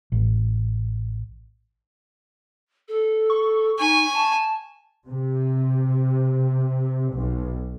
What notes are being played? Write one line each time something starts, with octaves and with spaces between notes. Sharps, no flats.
A1
A4
C#6
D#4 G#5
A5
C3
B1